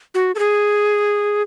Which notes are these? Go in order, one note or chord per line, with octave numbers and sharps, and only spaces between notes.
F#4
A4
G#4